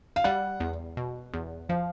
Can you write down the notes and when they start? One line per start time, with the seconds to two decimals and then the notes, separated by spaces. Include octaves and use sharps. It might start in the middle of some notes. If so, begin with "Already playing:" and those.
0.16 F5
0.24 G3 F#5
0.60 E2
0.97 B2
1.34 E2
1.69 F3 F5